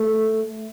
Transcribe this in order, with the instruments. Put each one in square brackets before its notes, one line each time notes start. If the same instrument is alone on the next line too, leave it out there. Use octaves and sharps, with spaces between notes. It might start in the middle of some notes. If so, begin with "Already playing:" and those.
Already playing: [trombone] A3